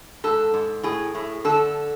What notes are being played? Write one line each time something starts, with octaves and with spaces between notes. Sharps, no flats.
G#2 A4
G#2
A2 G#4
A2
D3 A4